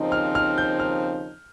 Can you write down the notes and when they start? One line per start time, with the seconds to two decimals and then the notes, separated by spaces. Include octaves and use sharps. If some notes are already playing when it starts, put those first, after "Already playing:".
Already playing: D#2 C#3 F3 C4 D#4
0.12 F6
0.35 F6
0.58 G6
0.80 F6